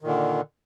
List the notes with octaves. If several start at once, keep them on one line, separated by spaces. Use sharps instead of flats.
A#2 D3 D#3